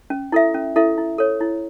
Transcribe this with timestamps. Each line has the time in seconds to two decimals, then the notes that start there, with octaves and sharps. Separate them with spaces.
0.10 C#4
0.32 E4 A4 E5
0.54 C#4
0.76 E4 A4 E5
0.98 E4
1.18 A4 C#5
1.40 E4